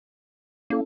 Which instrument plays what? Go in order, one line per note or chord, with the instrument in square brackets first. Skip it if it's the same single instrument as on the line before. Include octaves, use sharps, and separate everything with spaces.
[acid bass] A#3 [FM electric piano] C#4 E4 A4